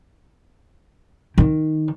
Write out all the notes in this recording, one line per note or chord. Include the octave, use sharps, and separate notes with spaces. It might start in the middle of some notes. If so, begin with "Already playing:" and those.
D#3